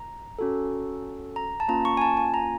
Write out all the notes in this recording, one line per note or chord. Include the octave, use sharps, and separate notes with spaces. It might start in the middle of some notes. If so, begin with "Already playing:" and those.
Already playing: A#5
C#4 F#4 A4
A#5
A5
A#3 C#4 F4 A#5
C#6
G#5
A5
G#5
A#5